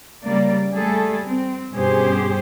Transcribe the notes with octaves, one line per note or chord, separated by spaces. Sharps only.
C#3 G3 A#3 D5
G3 A3 G#4 A4
C4
G2 B2 C#4 G4 G#4 C5